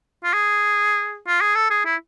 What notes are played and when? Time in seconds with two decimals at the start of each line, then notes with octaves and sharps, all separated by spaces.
0.24 F4
0.34 G#4
1.27 F4
1.41 G#4
1.55 A4
1.70 G#4
1.85 E4